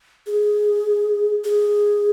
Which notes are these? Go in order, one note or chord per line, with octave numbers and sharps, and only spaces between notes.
G#4
G#4